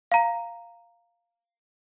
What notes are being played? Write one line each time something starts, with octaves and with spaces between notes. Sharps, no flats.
F5 A#5